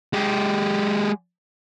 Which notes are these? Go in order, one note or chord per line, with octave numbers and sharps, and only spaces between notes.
G#3 G4